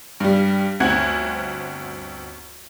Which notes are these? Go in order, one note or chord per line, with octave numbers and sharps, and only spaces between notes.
G2 G3
G1 D2 C4 F#5 G#6